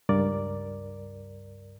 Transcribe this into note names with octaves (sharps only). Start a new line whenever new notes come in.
C#2 G2 A#4 D5